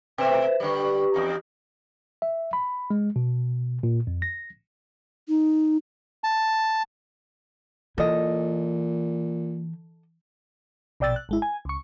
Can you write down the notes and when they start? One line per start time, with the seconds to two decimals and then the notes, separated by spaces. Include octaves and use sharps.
0.18 B2 A3 B4 C5 E5
0.60 D3 G3 B4 C#6
1.14 E2 D#4
2.22 E5
2.53 B5
2.90 G#3
3.16 B2
3.83 A#2
4.07 F2
4.22 A#6
5.28 D#4
6.24 A5
7.98 A#2 E3 A4 D#5
11.00 A#1 B2 D5 G5 E6 A6
11.16 F#6
11.29 G#1 G#3 E4
11.42 G#5
11.65 C#2 C#6